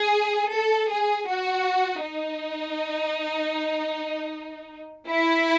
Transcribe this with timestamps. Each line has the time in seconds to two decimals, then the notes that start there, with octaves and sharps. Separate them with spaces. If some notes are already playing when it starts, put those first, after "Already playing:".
Already playing: G#4
0.53 A4
0.90 G#4
1.28 F#4
2.04 D#4
5.08 E4